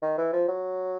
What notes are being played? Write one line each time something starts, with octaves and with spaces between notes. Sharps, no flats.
D#3
E3
F3
F#3